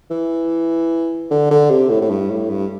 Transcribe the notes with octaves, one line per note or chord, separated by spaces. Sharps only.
E3
D3
D3
C3
A2
A2
G2
A2
G2